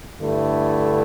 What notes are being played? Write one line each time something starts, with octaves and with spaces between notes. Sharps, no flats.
G2 D3 A3 E4